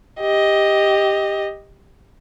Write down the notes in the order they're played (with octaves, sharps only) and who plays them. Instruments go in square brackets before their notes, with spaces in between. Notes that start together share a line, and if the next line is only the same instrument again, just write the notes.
[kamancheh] G4 D#5